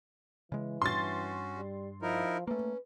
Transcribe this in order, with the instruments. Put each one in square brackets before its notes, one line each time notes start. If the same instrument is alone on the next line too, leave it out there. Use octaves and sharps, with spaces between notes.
[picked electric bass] C#3 G#3 [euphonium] E3
[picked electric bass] G2 [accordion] C#4 F#4 [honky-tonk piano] C6 A6
[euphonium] G3
[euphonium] F3 [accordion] D#4 E4 A#4
[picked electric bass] A3 A#3 [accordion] C#4 [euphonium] B4